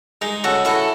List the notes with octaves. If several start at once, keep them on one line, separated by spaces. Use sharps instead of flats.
G#3 D#4
C#3 F#4 A4
E4 F#4 A4